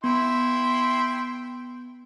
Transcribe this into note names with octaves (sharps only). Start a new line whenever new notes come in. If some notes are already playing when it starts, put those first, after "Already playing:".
B3 E4 G5 C6